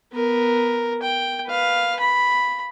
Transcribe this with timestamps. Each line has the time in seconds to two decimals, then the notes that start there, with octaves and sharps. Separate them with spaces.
0.13 B3 A#4
1.02 G5
1.47 B4 F5
1.99 B5